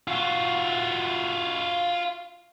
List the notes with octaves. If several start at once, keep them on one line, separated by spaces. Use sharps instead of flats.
F4 F#4